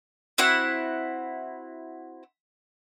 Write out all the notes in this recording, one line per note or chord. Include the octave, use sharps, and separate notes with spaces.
C4 E4 F#4 F#5